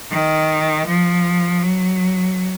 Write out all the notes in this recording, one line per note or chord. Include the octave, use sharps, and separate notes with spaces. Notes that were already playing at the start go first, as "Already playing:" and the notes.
D#3
F3
F#3